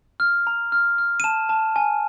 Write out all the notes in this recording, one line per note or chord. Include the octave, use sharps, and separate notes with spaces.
F6
A#5
F6
F6
D#7
A5 E7
A5
G#5